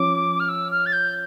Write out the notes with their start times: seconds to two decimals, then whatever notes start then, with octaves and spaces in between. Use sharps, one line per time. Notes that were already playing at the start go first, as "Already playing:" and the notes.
Already playing: F3 C#4 D6
0.40 F6
0.49 E6
0.71 F6
0.86 A6
0.93 G6